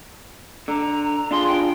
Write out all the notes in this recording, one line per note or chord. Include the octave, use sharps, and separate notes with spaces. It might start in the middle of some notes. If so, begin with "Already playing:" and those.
D3 A#5
D4 F4 G#4 C6
G5